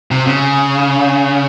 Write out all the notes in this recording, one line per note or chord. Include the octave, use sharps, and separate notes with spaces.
C3
C#3